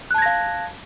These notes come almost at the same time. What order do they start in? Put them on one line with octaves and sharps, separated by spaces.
F#6 A5 G#6 A#6 F5